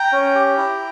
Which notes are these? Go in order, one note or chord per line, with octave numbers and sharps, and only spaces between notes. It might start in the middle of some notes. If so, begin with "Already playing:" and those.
Already playing: G5 A#5
C#4
G4
E4